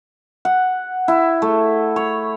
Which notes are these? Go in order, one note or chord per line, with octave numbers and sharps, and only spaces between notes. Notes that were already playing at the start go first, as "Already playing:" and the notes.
F#5
E4
A3
C#5